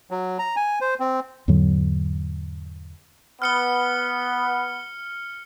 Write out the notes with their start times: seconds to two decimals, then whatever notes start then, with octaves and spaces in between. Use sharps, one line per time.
0.11 F#3
0.39 A#5
0.56 G#5
0.81 C5
1.00 C4
1.48 E2 G#2 D3 F#3
3.42 B3 F6 C#7 G7